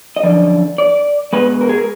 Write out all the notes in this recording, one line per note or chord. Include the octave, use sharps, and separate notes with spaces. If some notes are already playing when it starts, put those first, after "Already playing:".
D#5
F#2 D3 F3 D5
D5
B2 G#3 B4
A#4
G#4
A#4